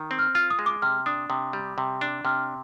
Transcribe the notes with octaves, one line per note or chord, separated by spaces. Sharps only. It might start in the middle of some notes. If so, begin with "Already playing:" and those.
Already playing: D#3
C4
F6
F4 F6
D#6
G#3
D6
C3 F6
D4 D#6
C3 D#6
G3
C3
D4
C3 F6